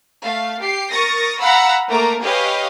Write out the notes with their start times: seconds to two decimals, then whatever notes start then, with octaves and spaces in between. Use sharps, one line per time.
0.24 A3 F5
0.61 G4 C7
0.91 A#4 C#6 D#6 A6 A#6
1.39 F5 F#5 A#5 B5 E6
1.89 A3 A#3 A#4 A#5 D6
2.23 G4 G#4 B4 C#5 D#5 F5